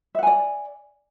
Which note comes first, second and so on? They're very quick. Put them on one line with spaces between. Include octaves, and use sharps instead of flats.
E5 F#5 G#5 D5